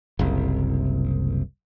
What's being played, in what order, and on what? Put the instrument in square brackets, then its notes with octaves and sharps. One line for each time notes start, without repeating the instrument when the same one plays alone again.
[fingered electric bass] F#1 C2 C3